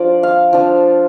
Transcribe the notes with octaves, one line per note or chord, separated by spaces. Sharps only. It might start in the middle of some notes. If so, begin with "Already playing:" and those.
Already playing: F3 D4 F4 D5
F5
F3 D4 F4